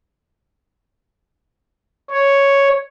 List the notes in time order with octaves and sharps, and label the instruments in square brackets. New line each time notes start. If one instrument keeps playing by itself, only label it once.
[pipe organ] C#5